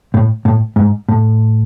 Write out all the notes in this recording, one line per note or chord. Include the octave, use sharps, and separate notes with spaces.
A2
A2
G#2
A2